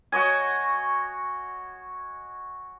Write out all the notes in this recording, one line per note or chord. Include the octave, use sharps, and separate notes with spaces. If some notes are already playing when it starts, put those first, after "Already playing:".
F#4 C#5 D#5 G#5